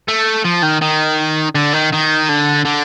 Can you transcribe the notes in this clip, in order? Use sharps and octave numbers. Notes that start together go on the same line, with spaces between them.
A3
F3
D#3
D#3
D3
D#3
D#3
D3
D3